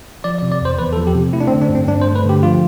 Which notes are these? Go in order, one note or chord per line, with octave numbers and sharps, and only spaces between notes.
F3 D5
D5
C3
D5
E2 C5
E2 B4
A4
F3
G4
C3
A3 E4
D4
C4
D3
D4
G2
C4
G2 D4
C5
A3
B4
D3 G4
F3 F4